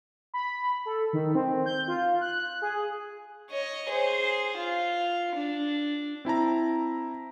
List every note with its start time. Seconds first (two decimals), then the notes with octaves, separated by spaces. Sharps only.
0.34 B5
0.86 A4
1.13 D#3
1.35 C4
1.66 G6
1.88 F4
2.21 F#6
2.62 G#4
3.51 C#5 D#5
3.89 G#4 C5
4.57 F4
5.35 D4
6.25 C4 E4 A5 A#5